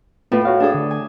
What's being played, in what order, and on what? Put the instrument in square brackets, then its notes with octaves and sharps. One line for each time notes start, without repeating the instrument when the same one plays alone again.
[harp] A2 [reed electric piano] B3 F4 B4
[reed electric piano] F#4 C#5 F5
[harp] D4 G#4 A4
[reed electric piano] D3
[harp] G#5